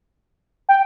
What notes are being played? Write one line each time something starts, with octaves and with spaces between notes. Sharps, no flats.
G5